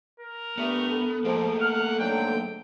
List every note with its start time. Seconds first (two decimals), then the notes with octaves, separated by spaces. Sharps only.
0.20 A#4
0.58 G2 A3 B3
0.89 A4
1.25 F2 G#2 F3 A3 A#3
1.60 F#5 F6
1.99 G#2 D3 F#3 G5